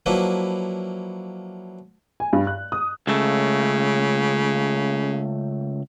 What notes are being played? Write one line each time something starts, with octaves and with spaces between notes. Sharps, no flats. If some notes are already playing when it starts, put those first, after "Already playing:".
F3 F#3 A#3 D4 E4 B4
G#5
G2
F#6
D#6
C#2 C#3 A3